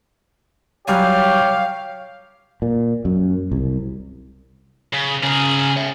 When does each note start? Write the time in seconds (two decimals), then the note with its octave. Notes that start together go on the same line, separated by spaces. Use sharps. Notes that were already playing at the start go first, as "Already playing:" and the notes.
0.87 F#3 G3 G4 C#5 F5 G#5
2.62 A#2
3.05 F#2
3.52 C2
4.93 C#3
5.23 C#3 G#4 A#4
5.76 C#5 E5